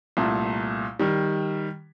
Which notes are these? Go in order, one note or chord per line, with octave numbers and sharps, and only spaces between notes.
C2 A#2 A3
D#3 G3